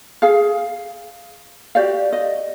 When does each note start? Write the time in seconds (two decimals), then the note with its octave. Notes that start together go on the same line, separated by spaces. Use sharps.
0.22 G#4 F5
1.75 F#4 G4 D5 F5
2.13 D#5